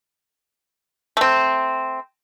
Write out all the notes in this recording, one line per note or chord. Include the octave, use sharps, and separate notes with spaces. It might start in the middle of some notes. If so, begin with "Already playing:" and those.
A3 C4